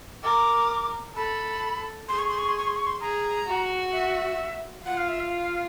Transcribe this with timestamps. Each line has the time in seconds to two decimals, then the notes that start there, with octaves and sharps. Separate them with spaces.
0.24 A#4 D6
1.16 A4 B5
2.09 G#4 C6
2.19 C#6
2.29 C6
2.38 C#6
2.48 C6
2.58 C#6
2.68 C6
2.76 C#6
2.87 C6
3.01 G#4 A#5
3.47 F#4
3.93 E5
4.85 F4 F#5
4.97 F5
5.08 E5
5.20 F5